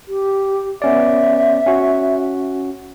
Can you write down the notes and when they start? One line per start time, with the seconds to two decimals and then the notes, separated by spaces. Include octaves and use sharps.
0.08 G4
0.82 B3 C#4 D5 E5
1.66 C#4 F#4